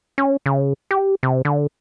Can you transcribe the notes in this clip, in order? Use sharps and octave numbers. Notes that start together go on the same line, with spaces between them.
C#4
C#3
G4
C3
D3